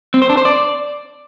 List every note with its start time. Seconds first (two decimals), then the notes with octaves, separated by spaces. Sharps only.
0.14 C4
0.22 C5
0.30 D4
0.37 C5
0.45 D5